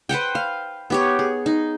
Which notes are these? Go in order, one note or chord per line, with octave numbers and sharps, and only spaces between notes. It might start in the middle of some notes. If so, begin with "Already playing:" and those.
B4 C5 F#5 G5
F5
B3 G4 C#5
G#4
D#4